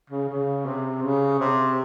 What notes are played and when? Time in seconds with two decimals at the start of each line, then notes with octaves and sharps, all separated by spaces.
0.10 C#3
0.29 C#3
0.66 C3
1.03 C#3
1.39 C3